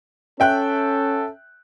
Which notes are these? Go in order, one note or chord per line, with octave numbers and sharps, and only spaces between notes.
C#4 A4 E5 G5 F#6